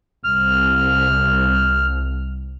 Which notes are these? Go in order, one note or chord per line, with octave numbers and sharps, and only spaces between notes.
C2 F6